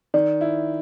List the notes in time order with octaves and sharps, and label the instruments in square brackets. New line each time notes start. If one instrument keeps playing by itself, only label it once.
[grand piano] D#3 [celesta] D5
[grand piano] E4